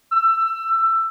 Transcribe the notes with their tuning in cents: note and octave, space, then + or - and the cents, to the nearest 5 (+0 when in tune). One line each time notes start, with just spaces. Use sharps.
E6 +20